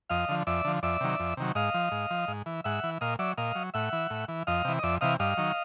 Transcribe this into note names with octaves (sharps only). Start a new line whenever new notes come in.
F2 D#5 F5
D3 F3
F2 D5 E5
D3 F3
F2 D5 E5
C3 D#3 F#3
F2
C3 D#3 F#3
G#2 D#5 F5
F3
G#2
F3
G#2
E3
G#2 E5 F#5
E3
A#2 D#5 F5
F#3 D5 E5
A#2 D#5 F5
F#3
A2 E5 F#5
E3
A2
E3
F2 D#5 F5
C3 E3
D#5
F2 D5 E5
C3 E3 D#5 F5
G2 D#5 F5
D#3 F#3